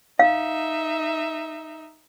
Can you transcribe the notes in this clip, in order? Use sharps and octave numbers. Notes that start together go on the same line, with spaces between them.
D#4 E5 F5